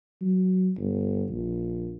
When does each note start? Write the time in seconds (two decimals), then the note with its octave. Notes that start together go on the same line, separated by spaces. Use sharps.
0.21 F#3
0.77 G1
1.31 A#1